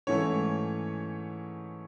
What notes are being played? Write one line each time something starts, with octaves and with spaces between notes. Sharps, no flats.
G#2 E3 A3 C#4 C#5